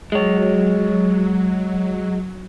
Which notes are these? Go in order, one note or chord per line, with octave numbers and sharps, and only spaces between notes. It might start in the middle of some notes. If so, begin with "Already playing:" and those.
F#3 G#3 C#5